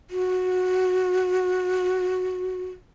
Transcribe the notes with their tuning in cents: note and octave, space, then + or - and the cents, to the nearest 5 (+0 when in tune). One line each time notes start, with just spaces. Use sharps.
F#4 -10